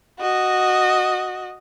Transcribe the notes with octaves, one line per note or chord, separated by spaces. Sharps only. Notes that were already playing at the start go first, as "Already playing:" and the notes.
F#4 D#5